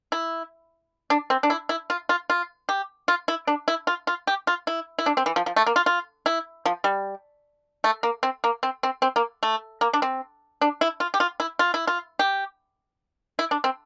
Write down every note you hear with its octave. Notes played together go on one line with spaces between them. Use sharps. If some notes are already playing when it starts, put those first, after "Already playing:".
E4
D4
C4
D4
E4
E4
F4
F4
F4
G4
F4
E4
D4
E4
F4
F4
G4
F4
E4
E4
D4
C4
E3
F3
F3
A3
A#3
F4
F4
E4
F3
G3
A3
A#3
C4
A#3
C4
C4
C4
A#3
A3
A#3
D4
C4
D4
E4
F4
G4
F4
E4
F4
E4
F4
G4
E4
D4
C4